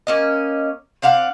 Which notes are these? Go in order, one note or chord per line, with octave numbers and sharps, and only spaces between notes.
A#3 C#4 D#5
C4 D4 F5 F#5